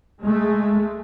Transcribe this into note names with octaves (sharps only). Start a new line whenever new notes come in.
G#3 A3